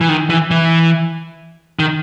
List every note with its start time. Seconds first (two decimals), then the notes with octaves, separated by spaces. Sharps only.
0.01 E3
0.09 D#3
0.30 E3
0.51 E3
1.79 D#3